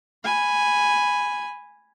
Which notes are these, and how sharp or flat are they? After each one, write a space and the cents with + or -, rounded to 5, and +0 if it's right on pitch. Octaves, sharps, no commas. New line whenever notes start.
G#5 -5 B5 +0